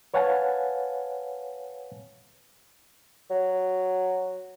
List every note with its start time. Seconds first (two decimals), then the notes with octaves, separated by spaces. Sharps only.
0.14 B4 C#5 F5 F#5 G#5 A5
3.30 F#3